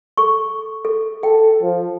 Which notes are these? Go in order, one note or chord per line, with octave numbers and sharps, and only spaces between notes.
A4 C#6
A4
A4 G5
F3